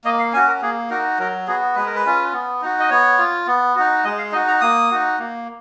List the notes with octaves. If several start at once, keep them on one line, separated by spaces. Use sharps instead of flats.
A#3 D#5
F5
C#4 F#4 G#5
A#4
A#3 G#4
D#4 F#4 A#4
F#3 A#4
B3 F#4 G#4
G#3 B4
A#4
B4
C#4 F4
B3
D#4 F#4
D#5
B3 C#5
F4
B3
D#4 F#4
G#3 D#5
F5
D#4 F#4 D#5
A#5
A#3 D#6
D#4 F#4
A#3